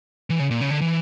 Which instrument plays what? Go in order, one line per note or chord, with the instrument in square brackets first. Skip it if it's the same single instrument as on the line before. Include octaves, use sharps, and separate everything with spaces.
[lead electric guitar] E3
C#3
A#2
C#3
D3
E3